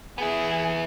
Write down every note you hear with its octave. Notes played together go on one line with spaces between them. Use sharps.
B3 E4 G#4